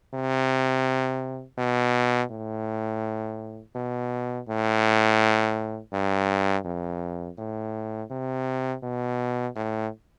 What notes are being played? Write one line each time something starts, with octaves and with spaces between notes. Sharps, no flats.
C3
B2
A2
B2
A2
G2
F2
A2
C3
B2
A2